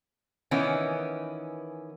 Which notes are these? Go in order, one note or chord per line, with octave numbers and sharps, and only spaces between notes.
D#3 E3 B3 C#4